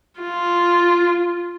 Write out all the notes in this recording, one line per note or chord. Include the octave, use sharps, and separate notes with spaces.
F4